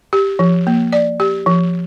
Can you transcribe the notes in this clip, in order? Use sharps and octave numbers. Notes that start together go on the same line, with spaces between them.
G4
F3
A#3
D5
G4
F3